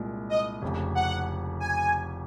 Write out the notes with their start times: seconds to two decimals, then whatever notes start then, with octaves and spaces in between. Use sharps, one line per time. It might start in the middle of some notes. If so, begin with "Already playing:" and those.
Already playing: C2 A#2 G#3
0.30 D#5
0.62 F1 F2 C#3
0.95 F#5
1.60 G#5